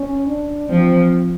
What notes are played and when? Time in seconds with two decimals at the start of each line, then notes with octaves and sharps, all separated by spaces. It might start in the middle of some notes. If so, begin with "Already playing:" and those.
Already playing: C#4
0.26 D4
0.69 F3 C4